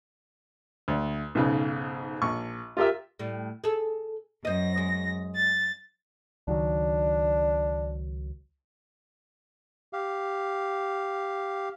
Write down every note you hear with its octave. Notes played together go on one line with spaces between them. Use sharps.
D2
B1 G#2 C#3
A#1 C#6
F4 G4 A#4 E5
A2 G3
G#4 A4
F#2 C5 D#5 A#6
G#3
A6
C#2 D#3 F#3 D4
G4 F5